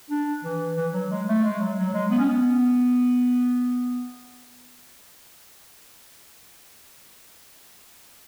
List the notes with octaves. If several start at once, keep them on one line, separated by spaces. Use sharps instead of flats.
D4
E3
E3
F#3
G#3
A3
G#3
F#3
F#3
G#3
B3
C#4
B3